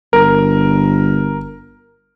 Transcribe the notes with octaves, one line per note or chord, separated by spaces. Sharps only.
G1 A#4